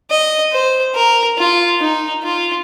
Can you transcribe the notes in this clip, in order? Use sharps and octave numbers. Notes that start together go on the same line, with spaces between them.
D#5
C5
A#4
F4
D#4
F4